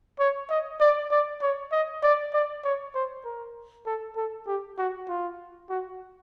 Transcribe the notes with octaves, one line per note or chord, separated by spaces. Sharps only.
C#5
D#5
D5
D5
C#5
D#5
D5
D5
C#5
C5
A#4
A4
A4
G4
F#4
F4
F#4